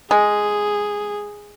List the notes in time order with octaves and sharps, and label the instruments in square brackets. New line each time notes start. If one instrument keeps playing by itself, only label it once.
[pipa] G#3 [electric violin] G#4